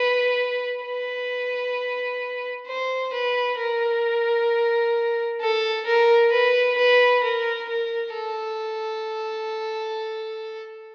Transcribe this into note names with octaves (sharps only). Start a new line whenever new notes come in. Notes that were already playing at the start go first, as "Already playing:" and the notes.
Already playing: B4
B4
C5
B4
A#4
A4
A#4
B4
B4
A#4
A#4
A4